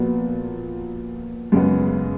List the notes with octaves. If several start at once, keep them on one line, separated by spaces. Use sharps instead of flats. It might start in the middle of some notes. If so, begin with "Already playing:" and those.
Already playing: A#2 F3 B3 F#4
F#2 C#3 G#3 B3